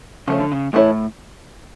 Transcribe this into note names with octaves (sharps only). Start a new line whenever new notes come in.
C#3 F3 A3 C#4
D3
C#3
A2 E3 A3 E4 A4 C#5